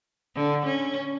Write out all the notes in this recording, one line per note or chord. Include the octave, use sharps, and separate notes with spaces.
D3
C#4